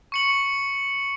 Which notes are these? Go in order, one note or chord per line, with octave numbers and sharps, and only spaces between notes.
C#6 C#7 F#7